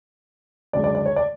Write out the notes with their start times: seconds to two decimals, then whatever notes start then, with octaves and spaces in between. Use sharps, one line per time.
0.73 F#2 D3 G#3 D5
0.84 D5
0.95 D5
1.06 C#5
1.16 D5